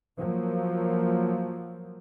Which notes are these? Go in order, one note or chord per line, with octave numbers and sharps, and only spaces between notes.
F3 F#3 A#3